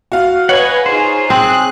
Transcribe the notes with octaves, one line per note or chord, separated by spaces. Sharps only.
F#4 F5
B4 C#5 D#5 F5 F#5 G#5
D#4 F4 G#4 C5
C4 G#4 F#6